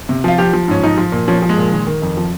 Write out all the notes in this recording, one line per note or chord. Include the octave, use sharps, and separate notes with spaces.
C3
F3 F4
F3 G4
F3
G#2 C#4
F3 D#4
F3
A#2
F3 C#4
F3
G#3
A#2
D#3
D#3
F2
F3